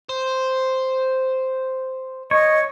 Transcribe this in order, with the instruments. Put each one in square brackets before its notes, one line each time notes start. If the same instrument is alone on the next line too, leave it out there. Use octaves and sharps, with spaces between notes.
[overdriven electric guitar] C5
[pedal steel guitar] C#5 [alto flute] D#5